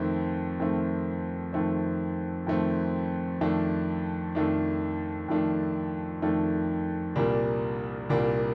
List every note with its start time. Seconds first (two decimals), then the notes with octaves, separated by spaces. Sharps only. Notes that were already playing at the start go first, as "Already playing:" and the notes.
Already playing: F2 D#3 A3 C4
0.60 F2 D#3 A3 C4
1.53 F2 D#3 A3 C4
2.47 F2 D#3 A3 C4
3.41 F2 D#3 A3 D4
4.35 F2 D#3 A3 D4
5.28 F2 D#3 A3 D4
6.22 F2 D#3 A3 D4
7.16 C2 A#2 G3 A#3 D4
8.09 C2 A#2 G3 A#3 D4